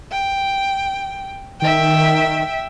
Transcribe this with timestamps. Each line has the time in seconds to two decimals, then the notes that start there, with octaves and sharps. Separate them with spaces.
0.12 G5
1.62 D#3 E5 G5